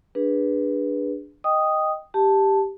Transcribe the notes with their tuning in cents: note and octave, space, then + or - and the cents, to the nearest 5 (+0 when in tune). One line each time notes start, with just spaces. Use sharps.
D4 +0 G#4 -20 B4 -10
D#5 +0 G5 +0 D#6 +0
G4 +0 A5 +0